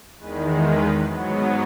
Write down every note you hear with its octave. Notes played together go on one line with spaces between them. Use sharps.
E2 D#3 G#3 B4
B4
G#2 F#3 B3